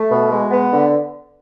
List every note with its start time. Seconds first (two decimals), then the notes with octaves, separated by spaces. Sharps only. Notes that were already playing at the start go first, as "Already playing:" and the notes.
Already playing: A3
0.10 B2
0.31 G#3
0.51 B3
0.72 D3